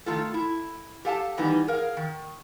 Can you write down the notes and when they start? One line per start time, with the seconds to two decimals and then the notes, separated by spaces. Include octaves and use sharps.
0.06 D#3 A3 F4 A4
0.34 E4
1.05 G4 A4 F5 G#5 A5
1.37 D#3 E3 G3 B3 D#4
1.67 G#4 A#4 F5
1.97 D#3